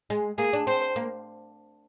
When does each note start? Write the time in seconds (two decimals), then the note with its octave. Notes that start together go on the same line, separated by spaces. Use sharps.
0.10 G#3
0.38 A#3 G#4
0.53 D4
0.67 C4 C5
0.96 A#3